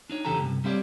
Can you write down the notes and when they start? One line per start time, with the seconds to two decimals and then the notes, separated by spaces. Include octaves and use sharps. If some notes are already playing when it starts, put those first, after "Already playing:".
0.10 D4 D#4 C#5
0.25 E2 C#3 E3 G4 A4 A#5
0.38 C2 G2 C3
0.64 G3 C4 E4 G4 C#5 D5